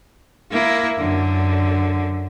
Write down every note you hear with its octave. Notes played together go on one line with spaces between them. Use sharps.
A#3 E4
F#2 D3